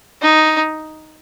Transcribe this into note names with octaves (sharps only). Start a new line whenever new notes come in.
D#4